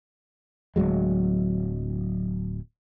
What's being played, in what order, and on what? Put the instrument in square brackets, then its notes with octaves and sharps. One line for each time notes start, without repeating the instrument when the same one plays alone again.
[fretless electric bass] D1 E2 F#3 G#3